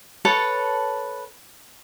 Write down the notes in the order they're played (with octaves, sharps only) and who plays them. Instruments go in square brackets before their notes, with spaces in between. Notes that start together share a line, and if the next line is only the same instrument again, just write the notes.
[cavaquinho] A4 B4 C#5 A5